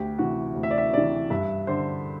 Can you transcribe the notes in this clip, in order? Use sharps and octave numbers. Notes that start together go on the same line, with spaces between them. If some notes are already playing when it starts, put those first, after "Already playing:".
Already playing: D2 G4
C3 E3 F#4
D2
E5
D5
E5
C3 E3 D5
G2 E5
D3 C5